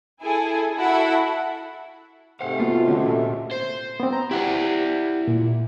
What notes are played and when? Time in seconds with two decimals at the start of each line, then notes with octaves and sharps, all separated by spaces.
0.21 E4 G#4 A4 G#5
0.75 E4 F#4 A4 E5 F#5 B5
2.41 G#2 C3 A3 C5 F5 F#5
2.60 A#3 B3 F4 F#4
2.88 D2 C#4 F#4
3.06 A#2 A4
3.52 C5
4.00 B3 C4
4.13 A#5
4.31 E4 G4 D5 F#5
5.28 A#2